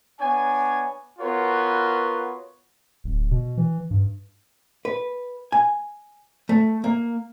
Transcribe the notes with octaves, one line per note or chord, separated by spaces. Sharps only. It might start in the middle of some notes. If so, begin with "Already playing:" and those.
B3 D4 C#5 G#5
B3 F4 F#4 A#4 B4 C#5
D1
B2
E3
G2
B4
G#5
A3
A#3